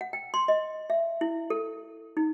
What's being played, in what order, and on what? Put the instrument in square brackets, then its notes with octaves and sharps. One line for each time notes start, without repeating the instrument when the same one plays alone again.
[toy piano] F#5
G5
C6
D#5
E5
E4
A4
D#4